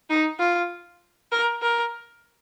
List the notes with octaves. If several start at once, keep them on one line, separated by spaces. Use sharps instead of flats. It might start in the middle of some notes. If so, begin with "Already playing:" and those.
D#4
F4
A#4
A#4